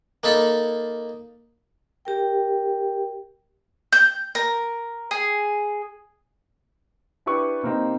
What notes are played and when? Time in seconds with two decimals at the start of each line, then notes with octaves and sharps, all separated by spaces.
0.23 A#3 D#4 A4 B5
2.05 G4 A#4 G5
3.92 G6
4.35 A#4
5.11 G#4
7.26 D4 E4 G4 B4 C#6
7.63 C3 A#3 C4 D#4